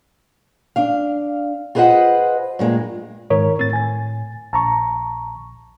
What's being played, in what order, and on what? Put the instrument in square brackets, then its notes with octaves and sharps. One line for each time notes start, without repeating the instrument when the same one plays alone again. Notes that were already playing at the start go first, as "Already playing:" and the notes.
[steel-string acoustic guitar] D4 F5
F4 G#4 B4 C5 D#5 F#5
G2 A#2 G#3
[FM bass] G#2 [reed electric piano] D#3 A#4 C#5
[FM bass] A2 [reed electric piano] C4 A6
[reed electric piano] G#5 A6
[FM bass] A#1 [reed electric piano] A5 A#5 C#6